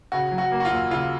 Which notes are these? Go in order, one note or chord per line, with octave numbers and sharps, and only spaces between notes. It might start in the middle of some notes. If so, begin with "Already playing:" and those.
C#3 F#4
F#3
F#4
A#3
F#4
F4
D#2
C#3 F4